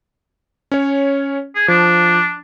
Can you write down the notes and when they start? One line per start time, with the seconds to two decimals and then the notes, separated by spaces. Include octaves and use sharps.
0.72 C#4 C#5
1.55 G#4
1.68 F3 D4